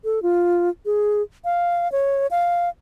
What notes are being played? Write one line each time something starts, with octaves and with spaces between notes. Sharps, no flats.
A4
F4
G#4
F5
C#5
F5